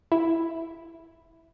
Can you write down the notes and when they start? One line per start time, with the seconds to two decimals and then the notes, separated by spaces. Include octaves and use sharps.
0.12 E4